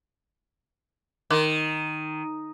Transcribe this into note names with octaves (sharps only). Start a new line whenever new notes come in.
D#3 A#4 C6 D6